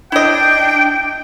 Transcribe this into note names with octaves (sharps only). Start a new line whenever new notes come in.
D4 E4 D#5 G5